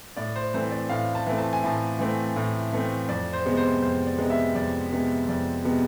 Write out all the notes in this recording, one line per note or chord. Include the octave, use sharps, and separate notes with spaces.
A2 D5
C5
E3 A3 C4 C5
D5
A2 F5
A5
E3 A3 C4
A5
G#5
A2 A5
E3 A3 C4
A2
E3 A3 C4
F2 D5
C5
C3 G#3 B3
C5
F2 C5
D5
C3 G#3 B3
E5
F2 D5
C3 G#3 B3
F2 D5
C3 G#3 B3